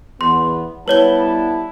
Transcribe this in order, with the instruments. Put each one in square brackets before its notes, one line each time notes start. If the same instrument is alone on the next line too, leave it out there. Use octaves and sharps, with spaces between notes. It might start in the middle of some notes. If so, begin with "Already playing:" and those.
[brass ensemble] E2 B3 [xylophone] C6
[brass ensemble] G3 B3 A5 [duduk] E4 [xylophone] B4 C#5 G7